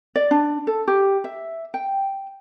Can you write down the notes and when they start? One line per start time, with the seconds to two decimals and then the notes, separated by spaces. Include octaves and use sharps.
0.16 D5
0.31 D4
0.67 A4
0.88 G4
1.24 E5
1.74 G5